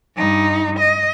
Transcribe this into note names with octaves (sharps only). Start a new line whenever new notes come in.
G2 D#4
D#5